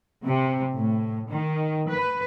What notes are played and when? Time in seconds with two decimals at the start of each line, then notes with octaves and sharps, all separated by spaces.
0.25 C3
0.72 A2
1.28 D#3
1.88 B4